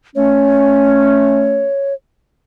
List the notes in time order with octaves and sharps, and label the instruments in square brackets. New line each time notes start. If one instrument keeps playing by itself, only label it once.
[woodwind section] A3 C#4 [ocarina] C#5